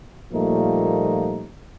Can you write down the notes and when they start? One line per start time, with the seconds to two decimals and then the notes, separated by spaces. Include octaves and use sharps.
0.33 A#2 F3 G3 A3 A#3 D#4